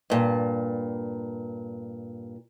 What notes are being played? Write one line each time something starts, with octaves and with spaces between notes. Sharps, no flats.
G2 A#2